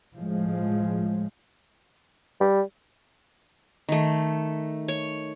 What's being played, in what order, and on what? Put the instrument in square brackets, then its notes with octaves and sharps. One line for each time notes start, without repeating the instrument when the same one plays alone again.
[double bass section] A2 F3 G#3
[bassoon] G3
[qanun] D#3 A3
C#5